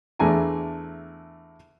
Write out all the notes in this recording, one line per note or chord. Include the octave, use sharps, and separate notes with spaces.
E2 A3 D4 G#5 A#5